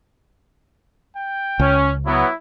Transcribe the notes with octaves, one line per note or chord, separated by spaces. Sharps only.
G5
C#2 C#4
F#3 B3 E4